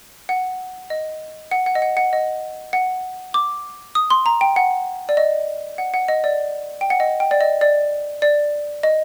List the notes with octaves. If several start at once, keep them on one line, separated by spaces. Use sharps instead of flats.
F#5
D#5
F#5
F#5
D#5
F#5
F#5
D#5
F#5
D6
D#6
C6
A#5
G5
F#5
D5
D#5
F#5
F#5
D#5
D5
G5
F#5
D#5
G5
D5
D#5
D5
D5
D#5